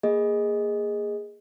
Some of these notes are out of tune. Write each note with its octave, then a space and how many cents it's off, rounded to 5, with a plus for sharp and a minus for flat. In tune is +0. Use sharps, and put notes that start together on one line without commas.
A#3 +0 G#4 -10 D#5 +0